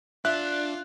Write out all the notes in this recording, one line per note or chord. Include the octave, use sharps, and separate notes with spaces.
D4 F4 E5 F#6